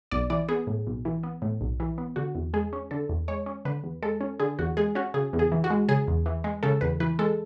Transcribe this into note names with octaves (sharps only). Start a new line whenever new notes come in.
B1 D5
E3 D5
B3 G#4
A2
B1
E3
B3
A2
B1
E3
B3
D3 F#4
E2
G#3 G#4
C#4
D3 A4
E2
G#3 C#5
C#4
D3 B4
E2
G#3 A4
C#4
D3 G#4
E2 F#4
G#3 G#4
C#4 F#4
C#3 G#4
E2
G#4
E3
F#4
G#3
C#3 G#4
E2
E3
G#3
C#3 A4
E2 B4
E3 B4
G#3 A4